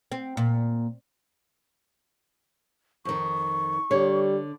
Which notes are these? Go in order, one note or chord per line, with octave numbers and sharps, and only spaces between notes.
C4
A#2
F2 D#3 C#6
D3 G3 C#5